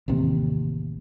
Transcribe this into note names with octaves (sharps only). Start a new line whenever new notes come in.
A1 D#2 C3